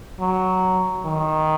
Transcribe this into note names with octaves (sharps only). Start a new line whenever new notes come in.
F#3
D#3